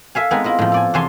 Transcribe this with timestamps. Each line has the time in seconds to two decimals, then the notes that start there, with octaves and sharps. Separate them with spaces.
0.15 A4 E5 F5 G#5
0.31 G#3 B3 C4 D#4 G#4
0.44 E4 F4 D#5
0.59 A2 F3
0.72 A4 D5 G#5
0.94 E2 C3 C#5 G#5 A5 C6